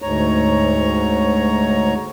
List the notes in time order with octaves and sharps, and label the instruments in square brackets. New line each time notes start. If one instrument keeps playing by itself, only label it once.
[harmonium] D2 G#2 C#5 A#5